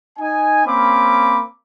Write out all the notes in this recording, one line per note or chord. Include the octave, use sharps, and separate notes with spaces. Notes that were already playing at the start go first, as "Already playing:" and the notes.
D#4 G#5
A#3 C4 C#4 B5 D6